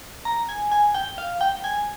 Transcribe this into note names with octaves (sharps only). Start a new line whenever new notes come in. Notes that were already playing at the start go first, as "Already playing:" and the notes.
A#5
G#5
G#5
G5
F5
G5
G#5